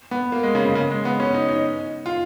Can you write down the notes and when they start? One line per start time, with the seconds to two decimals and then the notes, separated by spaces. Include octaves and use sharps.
0.11 B3
0.32 A#3
0.43 G#3
0.55 C#3
0.65 C#3
0.75 C#3
0.91 G#3
1.05 B3
1.20 C#4
1.34 D#4
1.48 D#4
2.06 F4